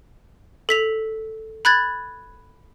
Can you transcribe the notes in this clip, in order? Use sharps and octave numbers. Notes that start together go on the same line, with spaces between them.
A4 B6 F7
B5 F#6 G#6 A6